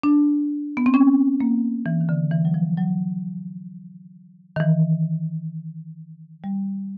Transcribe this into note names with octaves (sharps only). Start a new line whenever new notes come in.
D4
B3
C4
C#4
A#3
E3
D#3
D3
E3
F#3
F3
F#3
D#3
E3
G3